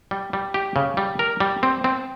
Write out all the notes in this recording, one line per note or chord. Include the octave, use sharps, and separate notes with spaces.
G3
G3
G4
C#3
G3
A#4
G3
C4
C4